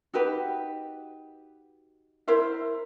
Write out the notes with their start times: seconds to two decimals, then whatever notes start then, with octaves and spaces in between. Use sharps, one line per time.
0.14 D#4 F#4 G4 B4
2.28 E4 A#4 C5 E5